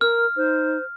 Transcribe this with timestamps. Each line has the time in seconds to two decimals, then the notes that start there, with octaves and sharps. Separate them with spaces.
0.01 A#4 F6
0.37 D#4 C5